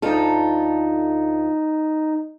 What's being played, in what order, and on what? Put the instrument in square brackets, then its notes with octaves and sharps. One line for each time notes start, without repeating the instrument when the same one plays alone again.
[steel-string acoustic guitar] D2 F4 A4 [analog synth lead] D#4